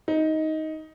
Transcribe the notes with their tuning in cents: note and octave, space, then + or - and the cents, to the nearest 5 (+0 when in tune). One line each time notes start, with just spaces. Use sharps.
D#4 +10